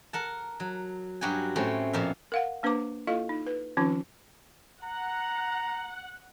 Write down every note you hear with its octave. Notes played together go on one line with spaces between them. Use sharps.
A#4 F#5 A5
F#3
G2 F#3 F#4 G4 F#5 G#5
A2 A3 C4 C#4
F2 A#2 B3 E5 F5
A#4 F5 F#5
A#3 D4 B4 C5 A#5 D6
A#3 E4 F4 A4 D#5 F5
D#4
B4
D#3 F3 C4 C#4 D#4 F4
F#5 A#5